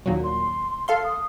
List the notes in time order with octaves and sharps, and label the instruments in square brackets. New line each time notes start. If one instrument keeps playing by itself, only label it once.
[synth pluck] D#2 A#2 F#3
[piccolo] C6
[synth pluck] A4 F5 C6
[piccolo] D#6